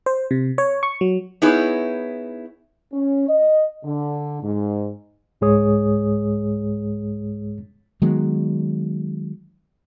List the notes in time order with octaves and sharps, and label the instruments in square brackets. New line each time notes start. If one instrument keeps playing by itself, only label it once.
[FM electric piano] C5
C3
C#5
C#6
F#3
[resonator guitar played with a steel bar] B3 D#4 E4 G#4 C#5
[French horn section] C#4
D#5
D3
G#2
[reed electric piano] C2 G#2 G#3 G#4 C#5 D#6
[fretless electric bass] D#3 F#3 G#3 B3